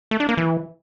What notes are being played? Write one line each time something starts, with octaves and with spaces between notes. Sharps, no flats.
A3
D4
A#3
E3